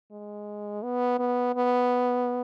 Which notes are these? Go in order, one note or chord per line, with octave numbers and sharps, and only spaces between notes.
G#3
B3
B3
B3